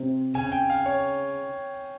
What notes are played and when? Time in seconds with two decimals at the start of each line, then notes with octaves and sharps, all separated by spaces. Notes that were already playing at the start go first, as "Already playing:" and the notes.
Already playing: C3 C4
0.34 C#3 C#4 G#5
0.52 G5
0.70 F5
0.86 C#5